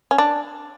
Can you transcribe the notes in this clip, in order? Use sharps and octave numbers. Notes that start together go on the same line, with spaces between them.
C#4
D4